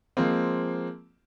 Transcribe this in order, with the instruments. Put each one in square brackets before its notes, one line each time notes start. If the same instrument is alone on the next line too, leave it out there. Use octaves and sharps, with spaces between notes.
[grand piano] F3 G#3 A#3 C4